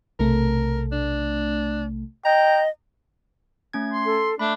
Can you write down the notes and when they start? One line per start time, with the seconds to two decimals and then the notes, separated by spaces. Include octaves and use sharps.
0.20 B1 C3 A3 A#4
0.92 D4
2.25 D#5 G5 A#5
3.73 A3 C#4 G#6
3.93 C6
4.05 A4
4.39 A3 D4 B5